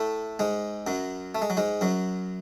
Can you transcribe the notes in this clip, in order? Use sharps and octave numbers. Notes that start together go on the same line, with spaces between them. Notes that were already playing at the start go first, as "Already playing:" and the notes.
Already playing: A2 A3
G#2 G#3
F#2 F#3
A3
G#3
F#3
G#2 G#3
F#2 F#3